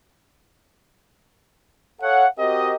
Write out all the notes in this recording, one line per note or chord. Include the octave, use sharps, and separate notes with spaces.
A4 C#5 F5 F#5
C4 F#4 G4 A#4 D#5